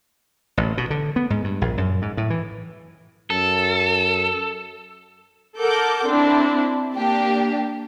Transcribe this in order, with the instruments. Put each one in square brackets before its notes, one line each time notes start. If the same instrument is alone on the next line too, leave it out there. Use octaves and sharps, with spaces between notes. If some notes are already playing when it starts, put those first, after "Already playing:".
[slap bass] A1
B2
D3
B3
G#2
G2
A#1
F#2
G#2
A2
E3
[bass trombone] F#2 [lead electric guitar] A4
[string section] A4 A#4 F#5 D6 G6
C4 D4 E4
A#3 D4 G4